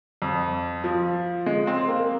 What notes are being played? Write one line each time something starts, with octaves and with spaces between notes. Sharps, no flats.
F2
F3
G#3
C4
A#3